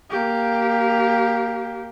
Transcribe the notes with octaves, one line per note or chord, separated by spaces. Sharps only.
A#3 G4